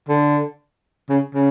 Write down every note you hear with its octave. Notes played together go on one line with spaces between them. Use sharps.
D3
C#3
C#3